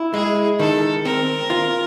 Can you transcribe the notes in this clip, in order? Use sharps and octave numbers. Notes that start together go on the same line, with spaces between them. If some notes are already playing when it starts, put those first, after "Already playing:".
Already playing: E4
G#3 G#4
D#3 A4
C4 A#4
F4